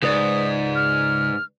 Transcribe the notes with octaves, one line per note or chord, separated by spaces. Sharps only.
C#2 G#2 B4 D5 D#6
F6